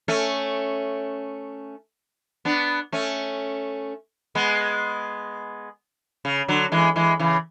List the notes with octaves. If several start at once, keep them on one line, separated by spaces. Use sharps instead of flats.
A3 C#4
B3 D4
A3 C#4
G#3 B3
C#3
D3 F#3
E3 G#3
E3 G#3
C#3 E3